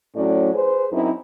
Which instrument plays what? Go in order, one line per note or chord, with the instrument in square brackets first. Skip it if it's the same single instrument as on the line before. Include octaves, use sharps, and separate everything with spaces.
[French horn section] A2 F#3 C#4 D5
G#4 B4 C5
F#2 C4 D#4 E4